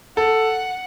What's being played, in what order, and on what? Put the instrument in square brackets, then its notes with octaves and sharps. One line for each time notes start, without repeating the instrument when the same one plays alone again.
[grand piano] A4 [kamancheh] F#5